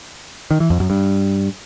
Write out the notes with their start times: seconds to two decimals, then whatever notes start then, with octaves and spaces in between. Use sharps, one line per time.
0.51 D#3
0.60 E3
0.70 F2
0.80 F#2
0.90 G2